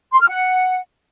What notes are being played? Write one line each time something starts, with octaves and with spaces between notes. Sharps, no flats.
C6
F6
F#5